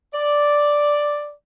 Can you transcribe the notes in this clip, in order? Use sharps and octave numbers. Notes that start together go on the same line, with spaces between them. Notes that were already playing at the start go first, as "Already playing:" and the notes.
D5